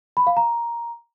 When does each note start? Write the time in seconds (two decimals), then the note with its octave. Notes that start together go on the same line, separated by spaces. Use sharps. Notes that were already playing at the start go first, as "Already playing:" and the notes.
0.17 B5
0.27 F5
0.37 A#5